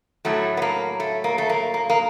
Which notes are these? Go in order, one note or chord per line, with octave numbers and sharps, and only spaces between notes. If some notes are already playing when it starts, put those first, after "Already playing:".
A2 F#3 A3
B3
A#3
A3
A#3
A3
A#3
A#3
A#3